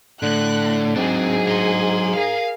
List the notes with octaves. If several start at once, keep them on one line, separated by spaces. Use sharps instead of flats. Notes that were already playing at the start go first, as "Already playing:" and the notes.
A2 D3 F#6
G#2 F#3 C4 D4 G#4
A#5 C6
G#4 A#4 F5